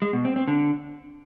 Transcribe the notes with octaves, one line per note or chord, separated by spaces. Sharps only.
G#3
B2
C4
C4
D3